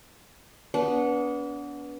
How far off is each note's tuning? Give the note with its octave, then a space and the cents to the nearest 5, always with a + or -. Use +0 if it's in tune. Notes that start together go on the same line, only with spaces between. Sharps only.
B3 -15 D4 -35